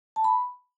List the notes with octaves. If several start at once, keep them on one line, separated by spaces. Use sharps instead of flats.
A5
B5